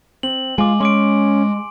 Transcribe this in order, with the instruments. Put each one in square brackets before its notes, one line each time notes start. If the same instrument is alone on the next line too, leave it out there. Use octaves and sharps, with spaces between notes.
[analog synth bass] C4 [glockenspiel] F#7
[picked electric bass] G#3 [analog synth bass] F4 [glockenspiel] G#5 D6
[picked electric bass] G#3 [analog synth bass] C#4 [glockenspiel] C6 D6 D7